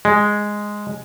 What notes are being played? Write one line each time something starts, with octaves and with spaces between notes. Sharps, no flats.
G#3